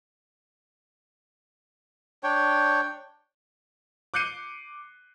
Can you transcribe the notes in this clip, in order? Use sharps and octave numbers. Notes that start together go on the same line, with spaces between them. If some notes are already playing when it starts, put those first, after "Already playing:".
D4 C#5 G5
D6 F#6 G6 C7 C#7 D#7